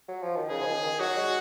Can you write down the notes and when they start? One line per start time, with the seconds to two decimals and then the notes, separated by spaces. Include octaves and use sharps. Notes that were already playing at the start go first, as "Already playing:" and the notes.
0.08 F#3
0.22 F3
0.36 D#3
0.50 C#3 G#4
0.61 F3
0.66 D#3
0.83 D#3
0.99 F#3 F#4
1.17 G#3